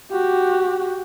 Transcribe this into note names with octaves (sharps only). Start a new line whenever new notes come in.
F#4 G4